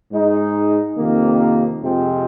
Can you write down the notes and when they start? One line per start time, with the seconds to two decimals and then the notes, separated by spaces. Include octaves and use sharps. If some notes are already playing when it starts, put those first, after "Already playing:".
0.12 G#2 G#3 D#4
0.97 F2 C3 D#3 A#3
1.82 F2 C3 F3 G#3 C4